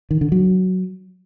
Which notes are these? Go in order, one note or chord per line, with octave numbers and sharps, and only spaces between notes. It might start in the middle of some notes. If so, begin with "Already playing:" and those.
D#3
D3
F#3